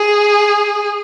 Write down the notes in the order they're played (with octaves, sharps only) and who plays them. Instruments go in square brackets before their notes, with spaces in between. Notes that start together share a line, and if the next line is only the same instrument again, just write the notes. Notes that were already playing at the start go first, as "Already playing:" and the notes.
Already playing: [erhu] G#4